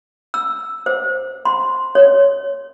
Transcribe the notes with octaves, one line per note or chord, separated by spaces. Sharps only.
E6
C5
C6
C#5